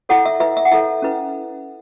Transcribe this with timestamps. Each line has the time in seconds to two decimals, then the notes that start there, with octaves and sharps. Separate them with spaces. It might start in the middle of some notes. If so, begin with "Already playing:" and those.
0.09 E4 A4 C#5 F#5
0.25 E5
0.40 E4 B4 E5
0.57 E5
0.65 F#5
0.72 E4 A4 C#5 E5
1.02 C#4 E4 B4